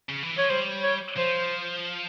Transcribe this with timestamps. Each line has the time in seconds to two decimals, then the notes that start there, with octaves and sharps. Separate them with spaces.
0.09 C#3
0.23 E3
0.37 F3 C#5
0.50 G3 C5
0.83 C#5
1.17 F3 C5